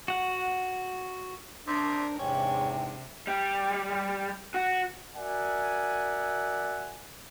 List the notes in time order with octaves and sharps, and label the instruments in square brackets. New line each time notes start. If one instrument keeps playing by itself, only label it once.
[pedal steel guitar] F#4 F#5
[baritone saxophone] C3 [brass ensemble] D4 [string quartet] A#4 C5
[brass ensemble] E2 G#2 [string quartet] C3 D4 [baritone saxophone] C#4 [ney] G5
[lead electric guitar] G3 G4
F#4
[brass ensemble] F#4 A#4 D5 E5 F#5 G#5